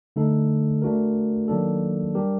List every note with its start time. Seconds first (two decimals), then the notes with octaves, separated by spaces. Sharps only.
0.16 D3 A3 D#4 A4
0.82 A3 D4 F#4 A#4
1.48 D#3 F#3 A#3 D4 A4
2.15 G3 D4 G4 A#4